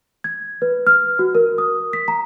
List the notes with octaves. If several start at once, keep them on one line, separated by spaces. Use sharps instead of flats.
G#6
B4
F6
F#4
A#4
D#6
B6
A#5